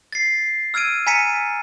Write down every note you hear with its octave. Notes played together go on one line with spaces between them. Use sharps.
A6 C7
E6 F6 G#6 D7 D#7
G#5 A#5 A6 B6 C#7 D#7